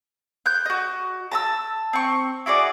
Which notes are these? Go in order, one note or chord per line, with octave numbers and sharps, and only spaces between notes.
F#6 G6
F#4 D#5
A5 A#5 E6
C4 C#6
E4 F#4 G#4 D5